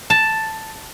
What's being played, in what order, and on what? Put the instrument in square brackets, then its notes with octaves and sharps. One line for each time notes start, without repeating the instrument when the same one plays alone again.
[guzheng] A5